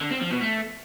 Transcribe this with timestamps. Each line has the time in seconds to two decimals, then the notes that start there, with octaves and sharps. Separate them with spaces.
0.01 D3
0.11 C4
0.21 F3
0.31 B2
0.41 A3